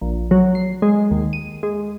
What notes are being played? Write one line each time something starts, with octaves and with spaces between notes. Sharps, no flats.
A#1
F#3
C7
G#3
D#2
D#7
G#3